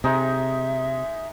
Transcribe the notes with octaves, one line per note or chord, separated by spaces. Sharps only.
C3 G#3 D#4 E5